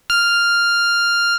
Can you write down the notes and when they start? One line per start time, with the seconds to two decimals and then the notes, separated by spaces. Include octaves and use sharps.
0.10 F6